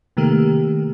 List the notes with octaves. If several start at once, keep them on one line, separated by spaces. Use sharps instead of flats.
C3 D#3 A3 A#3 G4